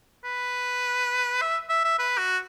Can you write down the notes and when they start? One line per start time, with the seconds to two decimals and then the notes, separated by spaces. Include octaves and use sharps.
0.25 B4
1.42 E5
1.69 E5
1.84 E5
1.99 B4
2.18 F#4